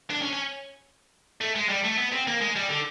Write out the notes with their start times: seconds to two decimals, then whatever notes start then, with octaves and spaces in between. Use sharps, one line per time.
0.11 D4
0.22 C#4
0.33 C#4
1.41 A3
1.55 G#3
1.69 G3
1.84 A3
1.97 B3
2.12 C4
2.27 A#3
2.41 G#3
2.56 G3
2.69 D3